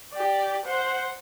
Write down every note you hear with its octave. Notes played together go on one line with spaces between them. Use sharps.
G4 D5
C5 F#5